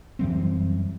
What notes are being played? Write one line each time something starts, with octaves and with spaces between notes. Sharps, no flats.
F#2 E3 G3 C4